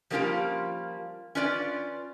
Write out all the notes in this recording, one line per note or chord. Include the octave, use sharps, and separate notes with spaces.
F3 G3 A#3 C#4 F4 G4
C#4 F4 B4 D5